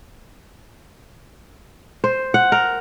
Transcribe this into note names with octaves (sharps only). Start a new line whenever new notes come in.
C5
F#5
A#4